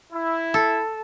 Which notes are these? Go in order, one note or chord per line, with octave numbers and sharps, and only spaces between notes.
E4
A4